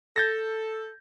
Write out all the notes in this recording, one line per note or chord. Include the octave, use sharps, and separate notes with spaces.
A4 G6 A6 A#6